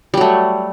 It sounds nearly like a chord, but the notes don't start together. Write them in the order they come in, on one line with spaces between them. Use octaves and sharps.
G3 F#3 A3